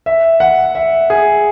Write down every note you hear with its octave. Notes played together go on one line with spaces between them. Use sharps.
E5
F#5
E5
G#4